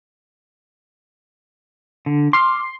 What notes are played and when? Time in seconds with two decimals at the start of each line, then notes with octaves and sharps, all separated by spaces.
2.06 D3
2.33 C6 D6 F6